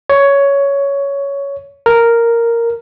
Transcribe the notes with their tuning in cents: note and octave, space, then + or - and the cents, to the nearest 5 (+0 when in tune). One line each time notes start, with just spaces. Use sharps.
C#5 +10
A#4 -5